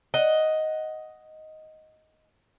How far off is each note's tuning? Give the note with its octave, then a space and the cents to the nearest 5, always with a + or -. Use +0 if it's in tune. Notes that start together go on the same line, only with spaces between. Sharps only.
D#5 +5 F#5 +0